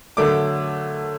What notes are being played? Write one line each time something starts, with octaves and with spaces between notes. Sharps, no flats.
D3 F#3 A3 D4 D6